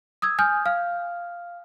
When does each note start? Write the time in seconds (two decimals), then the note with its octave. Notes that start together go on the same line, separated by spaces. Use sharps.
0.22 D#6 E6 G#6
0.39 G#5 D#6 F6 G6
0.66 F5 F6